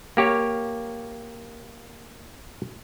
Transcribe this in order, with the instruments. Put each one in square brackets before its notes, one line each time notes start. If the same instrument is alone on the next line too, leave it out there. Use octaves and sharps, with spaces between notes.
[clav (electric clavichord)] A#3 G4 C#5 F5